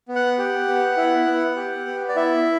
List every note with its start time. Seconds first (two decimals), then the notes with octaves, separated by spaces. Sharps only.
0.08 B3
0.16 F#5
0.38 G4
0.68 B3
0.97 E4
1.27 B3
1.56 G4
1.87 B3
2.09 D5
2.16 E4 E5